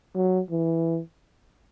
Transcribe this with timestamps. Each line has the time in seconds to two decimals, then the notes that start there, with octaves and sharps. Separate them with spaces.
0.16 F#3
0.50 E3